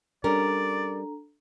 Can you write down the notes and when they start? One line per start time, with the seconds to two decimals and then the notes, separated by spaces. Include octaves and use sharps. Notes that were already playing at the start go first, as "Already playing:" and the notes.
0.24 G3 C#4 D4 A4 A#4 D5 A#5